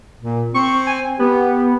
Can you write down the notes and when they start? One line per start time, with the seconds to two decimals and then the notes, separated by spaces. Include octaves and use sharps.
0.21 A#2
0.54 C4 C#6
0.87 G#5
1.19 B3 G4